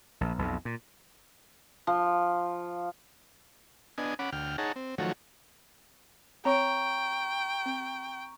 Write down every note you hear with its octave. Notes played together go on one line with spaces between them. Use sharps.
A#1
B1 F2
A#2
F3
B3 D4 D#5 G#5
C#4 F#5 B5 D6
D2 G5 F6
D#4 G#4 C#5 F#5 A5 A#5
C4
D#3 F3 F#3 A3 F#4 C#5
C4 C#5 G5 A#5 C#6 D7
C4